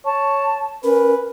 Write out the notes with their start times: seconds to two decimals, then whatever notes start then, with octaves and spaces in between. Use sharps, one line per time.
0.06 C#5 A5
0.84 C#4 A#4 B4